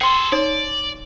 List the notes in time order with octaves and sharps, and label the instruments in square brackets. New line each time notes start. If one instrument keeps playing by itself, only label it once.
[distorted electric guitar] G#4 A4 [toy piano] G5 C6
[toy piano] D#4 C#5 [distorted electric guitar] D5